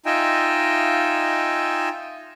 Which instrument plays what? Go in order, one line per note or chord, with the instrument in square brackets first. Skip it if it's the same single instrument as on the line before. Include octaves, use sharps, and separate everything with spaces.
[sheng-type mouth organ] D#4 F4 D#5 E5 G5 G#5